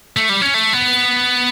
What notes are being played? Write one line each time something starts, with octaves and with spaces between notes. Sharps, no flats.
A3
G3
C#4
A3
B3